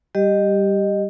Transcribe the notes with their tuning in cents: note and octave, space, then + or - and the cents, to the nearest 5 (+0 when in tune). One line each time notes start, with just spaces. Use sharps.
G3 +0 G4 +0 D#5 -15